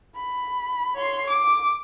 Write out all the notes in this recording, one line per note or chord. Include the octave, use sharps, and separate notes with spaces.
B5
C#5 C6
D6